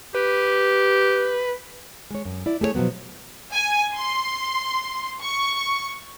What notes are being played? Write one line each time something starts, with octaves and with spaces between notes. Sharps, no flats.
G4 B4
G#3 C#5
F#2
E4 D5
A3 G#4 A4 C#5
B2 F3 F#3 B3
G#5
C6
C#6